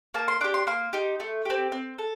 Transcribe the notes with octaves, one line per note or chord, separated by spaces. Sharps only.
A#3 A5
C6
D4 G4 D6
C6
A#3 C6
D#4 G4
A3
C4 G4
C4
A4